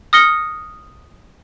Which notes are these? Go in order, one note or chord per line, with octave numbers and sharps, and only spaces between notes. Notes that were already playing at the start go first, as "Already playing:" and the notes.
D#6 F6 A#6 C#7 G7